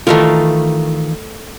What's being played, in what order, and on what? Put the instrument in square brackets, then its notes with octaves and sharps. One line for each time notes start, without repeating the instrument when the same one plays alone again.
[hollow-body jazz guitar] D#3 E3 F4 [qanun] A3 A#4